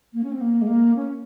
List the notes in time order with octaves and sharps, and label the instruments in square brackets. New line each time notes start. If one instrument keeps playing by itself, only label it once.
[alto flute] A#3
C#4
C4
A#3
G#3
A#3
C#4